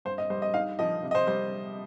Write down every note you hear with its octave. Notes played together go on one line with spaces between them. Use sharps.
G2 C5
D#5
G3 C5
D#5
D#4 F5
F3 D#5
C3
D#5
C5
G3 C5